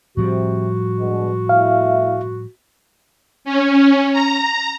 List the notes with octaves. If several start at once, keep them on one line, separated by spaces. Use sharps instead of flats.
A2 C3 F3 G3 F#4
B2 G#3 D4
A3 E4 E5 F5
C#4
A#5